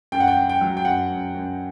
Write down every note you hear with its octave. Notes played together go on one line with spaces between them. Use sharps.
F#2 G5
F#5
G5
F#2
G5
F#3
G5
F#2 F#5
F#2
F#2